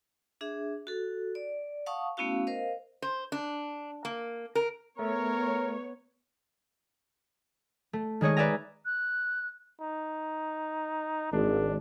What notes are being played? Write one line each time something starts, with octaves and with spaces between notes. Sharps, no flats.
D4 G#4 E5
F#4 A4
D5
F5 F#5 A5 C#6 D#6
A3 B3 C#4 E4 F#4 F5
A#4 C5 D#5 F5
C5
D4
A#3
A#4
A3 B3 A#4 C#5
A3
D#3 G#3 C#5 D#5
B4 D5 E5 G#5 A#5
F#6
D#4
G#1 D4